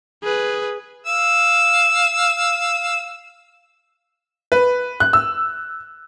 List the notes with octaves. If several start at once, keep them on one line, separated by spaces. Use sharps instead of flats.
G#4 B4
F5 E6
B4
F#6
E6